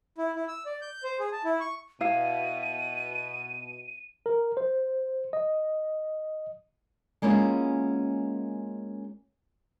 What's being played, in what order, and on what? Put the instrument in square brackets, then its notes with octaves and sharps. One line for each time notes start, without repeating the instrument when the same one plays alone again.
[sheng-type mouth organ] E4
E4
E6
D5
G6
C5
G#4
A5
E4
C#6
[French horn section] B2 [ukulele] E4 F5 [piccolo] D#7
[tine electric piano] A#4
C5
D#5
[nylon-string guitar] G#3 A#3 B3 C#4 E4 F4